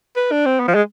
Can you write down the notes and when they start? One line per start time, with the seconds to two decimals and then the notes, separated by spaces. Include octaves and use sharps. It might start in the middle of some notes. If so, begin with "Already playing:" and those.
0.16 B4
0.32 D4
0.46 C4
0.60 B3
0.68 F3
0.75 G#3